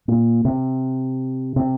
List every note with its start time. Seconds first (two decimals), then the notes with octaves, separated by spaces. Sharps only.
0.08 A#2
0.45 C3
1.56 C3